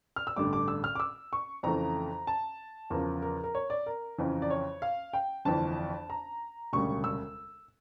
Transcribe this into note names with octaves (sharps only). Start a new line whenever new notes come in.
F6
E6
A1 G2 D3 D6
D6
E6
F6
D6
E6
C#6
F2 C#3 E3 A3 A#5
A5
E2 C#3 F3 A#4
A#4
A#4
C#5
D5
A#4
F2 C#3 E3
D5
C#5
F5
G5
G1 F2 E3 A5
A#5
E1 D2 C#3 G3 C#6
E6